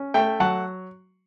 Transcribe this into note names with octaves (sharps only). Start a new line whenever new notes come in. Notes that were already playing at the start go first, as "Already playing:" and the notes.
Already playing: C#4
A3 E5 G5
F#3 F#5 A5